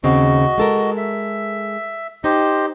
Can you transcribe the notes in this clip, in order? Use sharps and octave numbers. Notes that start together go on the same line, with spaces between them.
D#2 C#3 C4 F#4 D#5
G#3 A4 A#4
E5
D#4 G4 C5 D#5